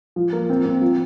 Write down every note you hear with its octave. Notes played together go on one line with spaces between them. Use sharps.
F3
A#3
C4
C4
F3